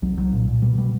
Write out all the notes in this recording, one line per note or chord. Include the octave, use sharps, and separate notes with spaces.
C2 F#3
C2 F#3
A#2
A#2
B2 G3
B2 G3